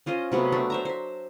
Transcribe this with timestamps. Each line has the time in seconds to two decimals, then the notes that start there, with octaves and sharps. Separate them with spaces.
0.06 C#4 F4 C5 D#5
0.32 C3 F#3 A3 B3
0.52 A3 D4
0.70 C5 E5 A#5
0.85 C5 E5